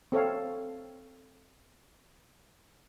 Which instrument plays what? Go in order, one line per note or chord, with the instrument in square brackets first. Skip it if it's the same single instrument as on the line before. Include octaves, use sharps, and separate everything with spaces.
[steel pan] C4 A4 C#5 F5